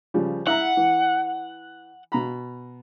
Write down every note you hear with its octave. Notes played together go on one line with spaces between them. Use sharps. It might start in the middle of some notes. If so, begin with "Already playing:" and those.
C#3 F3 G3
E4 E5 F#5 A#5
E3
B2 A#5 B5